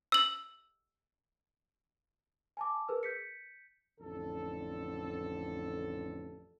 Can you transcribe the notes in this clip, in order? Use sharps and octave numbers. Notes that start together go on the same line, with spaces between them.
E6 F#7
G#5 A5 D6
G#4 A#4 B4 E6
G6 B6 C#7
A1 F2 D3 A4